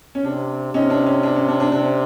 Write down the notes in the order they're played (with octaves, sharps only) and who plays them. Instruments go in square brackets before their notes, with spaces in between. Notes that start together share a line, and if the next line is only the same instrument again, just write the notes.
[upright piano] C#4
[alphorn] C3 [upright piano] D4
[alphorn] C3 [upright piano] C#4 D#4
[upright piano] D4
C#4
D4
C#4
D4
D4
[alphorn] C3 [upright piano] D4